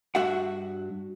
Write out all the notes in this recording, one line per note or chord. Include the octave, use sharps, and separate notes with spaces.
G2 F#4 E5 F#5